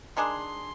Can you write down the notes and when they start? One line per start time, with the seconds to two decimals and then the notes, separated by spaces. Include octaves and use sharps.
0.16 D#3 G#3 D4 G#4 C6